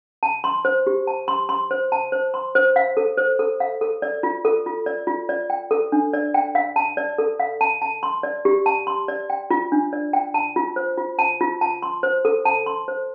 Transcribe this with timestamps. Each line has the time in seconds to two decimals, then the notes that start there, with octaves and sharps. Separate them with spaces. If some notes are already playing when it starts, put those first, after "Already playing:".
0.23 A5
0.44 C6
0.65 C5
0.87 G4
1.07 A5
1.28 C6
1.49 C6
1.71 C5
1.92 A5
2.12 C5
2.34 C6
2.55 C5
2.76 F5
2.97 A4
3.17 C5
3.39 A4
3.60 F5
3.81 A4
4.02 D5
4.23 F4
4.45 A4
4.66 F4
4.86 D5
5.07 F4
5.29 D5
5.50 G5
5.71 A4
5.92 D4
6.13 D5
6.34 G5
6.55 F5
6.76 A5
6.97 D5
7.18 A4
7.40 F5
7.61 A5
7.82 A5
8.03 C6
8.23 D5
8.45 G4
8.66 A5
8.87 C6
9.08 D5
9.30 G5
9.50 F4
9.72 D4
9.93 D5
10.13 G5
10.34 A5
10.56 F4
10.76 C5
10.97 F4
11.19 A5
11.41 F4
11.61 A5
11.82 C6
12.03 C5
12.25 A4
12.45 A5
12.66 C6
12.88 C5